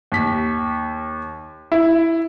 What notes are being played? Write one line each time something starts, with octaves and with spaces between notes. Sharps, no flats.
D#2 B6
E4